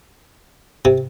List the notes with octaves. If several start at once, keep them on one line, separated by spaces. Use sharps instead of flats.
C3